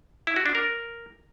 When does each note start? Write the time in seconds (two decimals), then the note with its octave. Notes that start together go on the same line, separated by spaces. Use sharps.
0.27 E4
0.36 F#4
0.46 D4
0.55 A#4